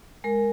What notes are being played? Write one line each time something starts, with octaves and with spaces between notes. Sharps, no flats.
G#3 A#4